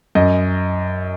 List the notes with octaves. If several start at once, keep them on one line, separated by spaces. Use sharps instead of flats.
F#2 D#5